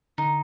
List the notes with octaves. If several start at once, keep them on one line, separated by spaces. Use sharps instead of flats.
D3 D#4